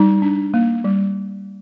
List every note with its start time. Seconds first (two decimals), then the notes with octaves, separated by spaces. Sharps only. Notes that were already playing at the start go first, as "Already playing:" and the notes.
Already playing: G3 D#4
0.22 D4
0.54 A#3
0.84 G3